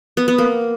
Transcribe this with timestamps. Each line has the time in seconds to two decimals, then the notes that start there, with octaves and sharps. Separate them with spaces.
0.17 B3
0.28 B3
0.38 A#3